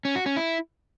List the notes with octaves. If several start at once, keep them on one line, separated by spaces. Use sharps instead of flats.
C#4
F#4
C#4
E4